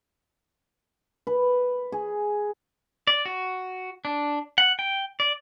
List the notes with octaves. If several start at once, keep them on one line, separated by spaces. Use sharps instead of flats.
B4
G#4
D5
F#4
D4
F#5
G5
D5